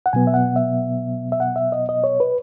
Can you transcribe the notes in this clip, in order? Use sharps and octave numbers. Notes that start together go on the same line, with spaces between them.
F#5
B2 F#3 B3 G#5
E5
F#5
E5
E5
F#5
E5
D#5
D#5
C#5
B4